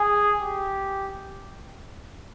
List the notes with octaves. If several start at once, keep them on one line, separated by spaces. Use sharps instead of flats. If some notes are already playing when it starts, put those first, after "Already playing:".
Already playing: G#4
G4